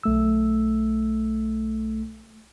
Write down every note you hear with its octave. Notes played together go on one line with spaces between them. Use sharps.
B1 A3 E6